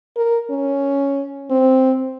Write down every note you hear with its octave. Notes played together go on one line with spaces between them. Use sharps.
A#4
C#4
C4